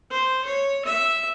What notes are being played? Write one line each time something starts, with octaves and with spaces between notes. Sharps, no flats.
C5
C#5
E5